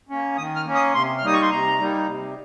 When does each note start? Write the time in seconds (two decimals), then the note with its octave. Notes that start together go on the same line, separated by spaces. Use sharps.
0.09 A#3 C#4
0.37 D#3 D#6
0.56 F6
0.65 A#3 C#4
0.75 D#6
0.94 C3 C6
1.18 F6
1.22 G3 A#3 D#4 D#6
1.33 C#6
1.42 C6
1.50 C3 A#5
1.79 G3 A#3 D#4
2.06 C3